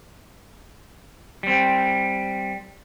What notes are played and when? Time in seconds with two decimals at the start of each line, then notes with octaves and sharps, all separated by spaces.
1.43 G3 C4